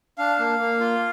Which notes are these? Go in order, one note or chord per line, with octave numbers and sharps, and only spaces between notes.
D4 F5
A#3
A#3
F4